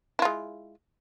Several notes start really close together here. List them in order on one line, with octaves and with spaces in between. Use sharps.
E4 F4 G#3